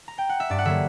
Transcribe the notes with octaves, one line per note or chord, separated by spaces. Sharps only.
A#5
G5
F#5
E5
G2 D5
F#5
D3 F#3 A#3 E5